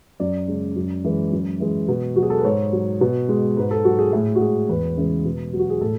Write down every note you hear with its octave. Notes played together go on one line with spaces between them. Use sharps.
F#2 D5
C#3 G#3
F#2
E3 G#3
F#2
E3 G#3
B2
F#3 F#4
G#4
A4
B4
G#2 C#5
F#3
B2
G#3
G#2 B4
A4
F#3 F#4
G#4
A2 G#4
F#4
G#3 G#4
E2 B4
C#3 E3 G#3
B2
F#3
F#4
G#4
A2 A4